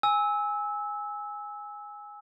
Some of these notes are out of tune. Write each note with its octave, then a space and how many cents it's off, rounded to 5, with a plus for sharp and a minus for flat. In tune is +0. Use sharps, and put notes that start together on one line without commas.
G#5 -5 E6 -20